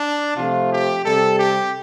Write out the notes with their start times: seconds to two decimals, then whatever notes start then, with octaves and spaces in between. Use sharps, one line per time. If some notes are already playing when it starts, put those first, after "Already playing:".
Already playing: D4
0.37 C3 F3 A3 F4
0.71 G4
1.04 C3 G3 A4
1.39 G4